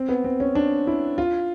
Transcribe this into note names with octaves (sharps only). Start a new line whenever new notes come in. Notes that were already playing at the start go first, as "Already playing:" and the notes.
Already playing: C4
B3
C4
C#4
D4
E4
F4